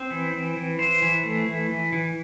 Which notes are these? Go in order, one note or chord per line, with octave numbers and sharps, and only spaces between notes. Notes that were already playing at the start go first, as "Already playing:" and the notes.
Already playing: C4
E3
C4
E3
E3 C5
E3
A3
E3
E3
E3